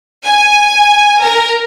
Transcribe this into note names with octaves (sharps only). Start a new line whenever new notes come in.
G#5
A#4